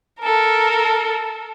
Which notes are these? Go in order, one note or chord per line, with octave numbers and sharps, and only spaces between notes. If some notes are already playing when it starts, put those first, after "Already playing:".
A4 A#4